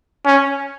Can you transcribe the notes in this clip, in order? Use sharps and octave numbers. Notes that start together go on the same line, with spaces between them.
C#4